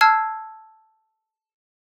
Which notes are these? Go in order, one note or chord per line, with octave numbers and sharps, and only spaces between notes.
A5 E6 F6 G#6 C7